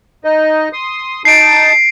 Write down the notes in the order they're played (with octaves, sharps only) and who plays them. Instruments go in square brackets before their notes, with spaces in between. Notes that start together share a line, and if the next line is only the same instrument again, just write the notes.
[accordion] D#4 D#5
C6 D#6
[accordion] D#4 A5 [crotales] C7 D7